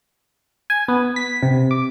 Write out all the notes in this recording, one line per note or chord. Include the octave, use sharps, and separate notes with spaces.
G#5
B3
B6
C3
D6